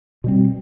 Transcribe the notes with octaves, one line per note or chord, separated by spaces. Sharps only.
B2 G3 C4